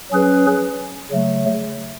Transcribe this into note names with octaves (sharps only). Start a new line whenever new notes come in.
F#3 C#4 G#4 B4
C#3 F#3 A3